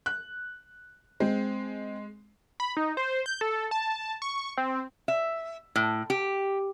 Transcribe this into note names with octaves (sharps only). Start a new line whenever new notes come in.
F#6
G#3 C4
B5
D#4
C5
G6
A4
A5
C#6
C4
E5
A2
G4